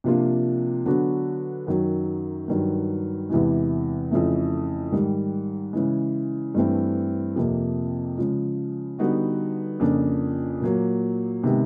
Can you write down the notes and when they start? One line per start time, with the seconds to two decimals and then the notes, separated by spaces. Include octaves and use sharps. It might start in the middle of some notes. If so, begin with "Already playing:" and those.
0.04 C3 F3 A#3 D4 F4
0.86 D3 F#3 B3 D4 F#4
1.67 F#2 D#3 F#3
2.48 G2 D#3 F#3
3.29 E2 C3 E3 G#3
4.11 F2 C#3 E3 A3
4.92 G#2 D#3 G3
5.73 C#3 E3 G#3
6.55 G2 E3 A3 C4
7.36 F2 C3 F3 A#3
8.18 C#3 F3 G#3
8.99 D3 G3 B3 D#4 F#4
9.80 F2 C#3 F3 A#3 D4
10.61 A#2 F#3 A#3
11.44 C3 D#3 G#3 B3